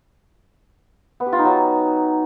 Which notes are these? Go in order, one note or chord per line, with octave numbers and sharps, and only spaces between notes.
B3
G4
F4
D#4
F#3